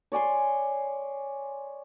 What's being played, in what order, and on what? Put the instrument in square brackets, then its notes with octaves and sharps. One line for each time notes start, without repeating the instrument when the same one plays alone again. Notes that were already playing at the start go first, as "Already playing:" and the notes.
[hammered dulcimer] C#5 D5 G#5 C6